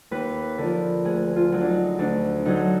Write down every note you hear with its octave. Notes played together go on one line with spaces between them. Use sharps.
D#2 B4
D3 F3 A#4
D2 G#4
F4
D3 F#3
D4
D#4
D2 D4
D3 F#3 D#4